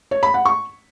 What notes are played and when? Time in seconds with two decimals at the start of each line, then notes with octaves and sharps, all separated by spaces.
0.11 C#5
0.23 B5
0.34 F#5
0.45 C#6